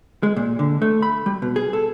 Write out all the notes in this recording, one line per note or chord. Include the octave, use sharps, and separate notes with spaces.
G#3
A#2
D3
A3
B5
G3
B2
G#4
A4